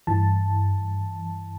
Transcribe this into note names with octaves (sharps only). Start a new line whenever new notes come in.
G2 E3 A5